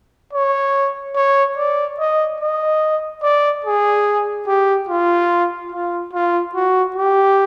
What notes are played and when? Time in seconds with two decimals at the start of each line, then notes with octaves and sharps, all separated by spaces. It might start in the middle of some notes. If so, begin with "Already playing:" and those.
0.33 C#5
1.15 C#5
1.57 D5
1.99 D#5
2.40 D#5
3.23 D5
3.65 G#4
4.47 G4
4.89 F4
5.72 F4
6.13 F4
6.55 F#4
6.96 G4